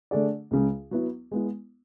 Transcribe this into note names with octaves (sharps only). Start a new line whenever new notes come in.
D3 A3 D4 G#4 D5
C#2 C#3 G#3
F#3 B3 E4
G#3 B3 E4